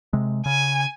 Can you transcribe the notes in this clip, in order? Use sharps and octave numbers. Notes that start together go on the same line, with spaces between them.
C3 G#3
C#3 G#5